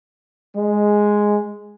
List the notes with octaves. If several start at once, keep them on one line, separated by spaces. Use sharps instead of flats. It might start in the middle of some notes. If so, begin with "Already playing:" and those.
G#3